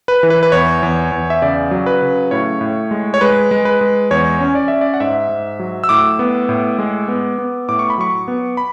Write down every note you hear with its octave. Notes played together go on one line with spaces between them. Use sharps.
B4
E3
B4
B4
E2 C#5
E2
E2
E5
C#3 D5
F#3
B4
C#3
A2 C#5
A2
G#3
C#5
G#3 B4
G#3
B4
G#3
E2 C#5
C#4
D5
C#4 E5
D5
F#5
G#2 E5
G#2
F#3
E6
A2 D6
B3
A2
G#3
B3
B3
A2 D6
C#6
B5
F#3 C#6
B3
B5